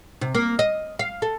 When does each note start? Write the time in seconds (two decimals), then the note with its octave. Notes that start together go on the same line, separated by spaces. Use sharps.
0.21 C3
0.35 A#3
0.59 D#5
0.99 F5
1.22 A4